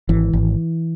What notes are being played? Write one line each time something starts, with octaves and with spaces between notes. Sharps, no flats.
G#1 E3
G#1